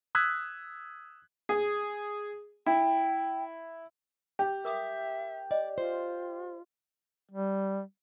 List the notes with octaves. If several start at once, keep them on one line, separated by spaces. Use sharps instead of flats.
D#6 E6 F#6 G#6 B6
G#4
E4 G5
G4
A#4 E5 D6 D#6
D5 D#5
F4 C5
G3